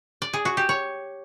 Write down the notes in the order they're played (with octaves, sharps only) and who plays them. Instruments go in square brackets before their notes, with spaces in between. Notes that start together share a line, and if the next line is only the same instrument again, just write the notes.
[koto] D5
G#4
F#4
G4
C#5